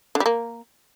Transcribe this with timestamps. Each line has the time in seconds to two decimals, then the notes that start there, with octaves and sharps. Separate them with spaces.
0.15 D3
0.20 G3
0.26 A#3